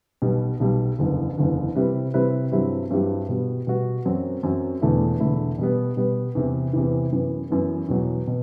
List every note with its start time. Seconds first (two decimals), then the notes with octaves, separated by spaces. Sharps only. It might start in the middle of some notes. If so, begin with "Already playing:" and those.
0.22 B1 B2 G3
0.60 B1 B2 G3
0.99 F#1 E2 D3
1.37 F#1 E2 D3
1.75 C3 G3 C4 E4 B4
2.14 C3 G3 C4 E4 B4
2.52 G2 F#3 C4 E4 G4
2.90 G2 F#3 C4 E4 G4
3.29 B2 G3 B3 F#4
3.67 B2 G3 B3 F#4
4.06 F#2 F#3 C4
4.43 F#2 F#3 C4
4.81 E1 E2 D3 A3 E4
5.20 E1 E2 D3 A3 E4
5.58 B2 G3 B3
5.97 B2 G3 B3
6.35 E2 C3 E3
6.73 E2 C3 E3
7.12 F#2 E3 B3
7.50 F#2 E3 B3
7.89 E2 B2 F#3
8.28 B2